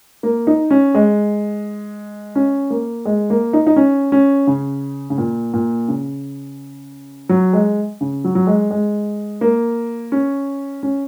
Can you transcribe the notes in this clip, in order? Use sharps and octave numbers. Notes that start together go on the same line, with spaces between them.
A#3
D#4
C#4
G#3
C#4
A#3
G#3
A#3
D#4
D#4
C#4
C#4
C#3
C#3
A#2
A#2
C#3
F#3
G#3
C#3
F#3
F#3
G#3
G#3
A#3
C#4
C#4